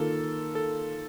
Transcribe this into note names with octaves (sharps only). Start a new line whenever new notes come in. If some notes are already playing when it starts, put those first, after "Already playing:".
Already playing: D#3 A#3 F4 A4 A#4
A4